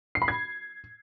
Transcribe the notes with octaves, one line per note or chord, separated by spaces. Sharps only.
C7
B5
G#6